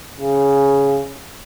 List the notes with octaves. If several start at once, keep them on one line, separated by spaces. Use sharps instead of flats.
C#3